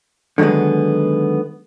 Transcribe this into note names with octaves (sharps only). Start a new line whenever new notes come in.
D3 D#3 F#3 G#3 B3